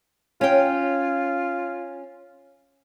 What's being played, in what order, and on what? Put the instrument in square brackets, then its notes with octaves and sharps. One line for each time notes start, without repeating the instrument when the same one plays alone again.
[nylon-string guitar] C#4 G5 [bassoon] F4